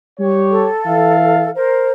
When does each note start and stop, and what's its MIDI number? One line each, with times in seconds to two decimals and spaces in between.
0.19 0.67 55
0.19 0.67 67
0.19 0.67 73
0.50 1.49 69
0.85 1.51 52
0.85 1.51 76
0.85 1.51 77
1.55 1.92 70
1.55 1.92 72